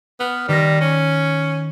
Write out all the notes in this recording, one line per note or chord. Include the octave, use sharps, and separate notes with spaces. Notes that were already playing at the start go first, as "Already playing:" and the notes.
B3 F6
D#3 G3 A#6
C#4